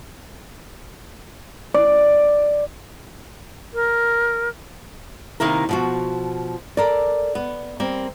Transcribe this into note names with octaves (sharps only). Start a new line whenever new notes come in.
D5
A#4
C3 D#3 A#3 E4 A#4
B2 F3 F#4
A4 A#4 D5
B3
G3 A#3 C4